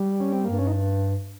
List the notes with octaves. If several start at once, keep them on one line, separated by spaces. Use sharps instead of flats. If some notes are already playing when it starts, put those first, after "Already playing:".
Already playing: G3
C#4
C4
G2 A#3
C#4
D#4